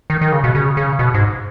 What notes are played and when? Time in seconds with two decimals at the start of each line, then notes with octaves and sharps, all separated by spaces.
0.10 D#3
0.21 D#3
0.32 C#3
0.44 B2
0.55 C#3
0.77 C#3
0.99 B2
1.14 G#2